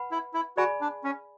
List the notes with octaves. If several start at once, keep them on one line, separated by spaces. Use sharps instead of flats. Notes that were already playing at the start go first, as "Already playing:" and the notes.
Already playing: B4 F#5 B5
E4
E4
F#4 G#4 D5 G#5 B5
D4
C#4